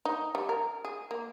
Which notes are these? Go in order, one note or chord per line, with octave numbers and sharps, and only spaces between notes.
D#4
G3
A#4
G#4
A#3